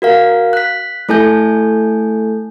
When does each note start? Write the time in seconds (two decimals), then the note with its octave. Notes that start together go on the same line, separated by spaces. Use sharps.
0.02 F#4 A#4 F5
0.53 F#6 B6
1.09 A3 E4 A4 G#5 G6